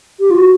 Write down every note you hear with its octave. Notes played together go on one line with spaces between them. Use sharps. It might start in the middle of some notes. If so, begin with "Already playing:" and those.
G4
F4
F#4